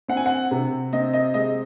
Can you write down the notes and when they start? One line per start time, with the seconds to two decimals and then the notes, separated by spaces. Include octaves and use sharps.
0.08 C4 F#5
0.17 G#5
0.26 F#5
0.51 C3
0.93 C4 D#5
1.13 D#5
1.34 G#3 D#5